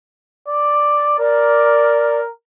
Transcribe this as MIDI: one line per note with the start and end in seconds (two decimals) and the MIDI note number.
0.48 1.18 74
1.19 2.29 70
1.19 2.21 74